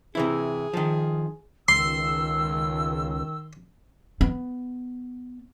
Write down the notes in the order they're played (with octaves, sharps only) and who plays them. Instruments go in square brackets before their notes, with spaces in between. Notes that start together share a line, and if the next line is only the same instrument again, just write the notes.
[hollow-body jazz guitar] C3 E3 E4 [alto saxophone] G#4
[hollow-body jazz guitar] D#3 F3
[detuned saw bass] C#2 [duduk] D#3 [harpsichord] C6 [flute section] E6
[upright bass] B3